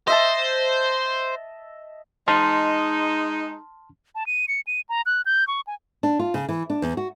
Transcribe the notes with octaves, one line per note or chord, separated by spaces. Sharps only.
C5 D#5 E5 A5
G#3 D#4 A5 C6 F6
A5
D#7
C#7
D#7
A#5
F#6
G6
C#6
G#5
D4
F4
C#3
E3
D4
E2
F#4